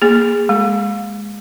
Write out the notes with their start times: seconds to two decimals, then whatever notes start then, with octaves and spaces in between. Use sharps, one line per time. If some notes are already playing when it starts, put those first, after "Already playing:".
0.02 A#3 G#4
0.49 G#3